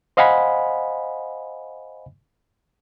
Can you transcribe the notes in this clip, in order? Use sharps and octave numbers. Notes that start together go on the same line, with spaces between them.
C5 D#5 F5 F#5 G#5 B5